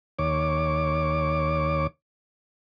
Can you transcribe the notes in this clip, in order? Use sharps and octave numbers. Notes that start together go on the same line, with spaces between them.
D#2 C#5 D6